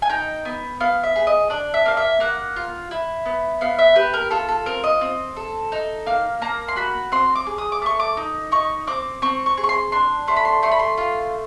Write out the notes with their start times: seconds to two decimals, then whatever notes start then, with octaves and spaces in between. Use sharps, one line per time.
0.02 G#5
0.10 D#4 G5
0.45 B3
0.80 B3 F5
1.03 E5
1.16 G#4
1.27 D#5
1.50 D4 D5
1.74 E5
1.85 A#3 F5
1.97 E5
2.20 A#3 F#5
2.56 F4
2.91 E4
3.26 B3
3.61 B3 F5
3.79 E5
3.96 G4 B4
4.14 A#4
4.31 F4 A4
4.49 A4
4.66 C4 A#4
4.84 D#5
5.01 C4
5.36 A4
5.72 D#4
6.06 A#3 F5
6.42 A#3 A#5
6.68 C6
6.76 F#4 B5
7.12 C4 C6
7.35 D6
7.47 G#4
7.58 D#6
7.72 D6
7.82 A3 C#6
8.00 D6
8.17 D#4
8.52 D#4 C#6
8.87 C4 D6
9.22 C4 C#6
9.46 C#6
9.57 G#4
9.64 C#6
9.69 C6
9.92 D4 C6
10.28 A3 C6
10.36 B5
10.45 C6
10.63 A3 C6
10.71 B5
10.79 C6
10.98 F4 C6